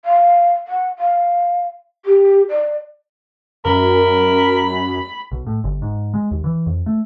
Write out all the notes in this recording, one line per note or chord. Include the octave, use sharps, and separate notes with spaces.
F5
F#5
F5
G4
D5
F#2 A#4 B5
B1
A2
G1
G#2
G#3
D#2
E3
F2
A3